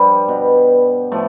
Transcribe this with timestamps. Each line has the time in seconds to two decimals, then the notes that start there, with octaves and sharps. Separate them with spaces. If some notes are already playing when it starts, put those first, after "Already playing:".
Already playing: G2 F3 G3
0.28 B2
1.12 A2 F3 A3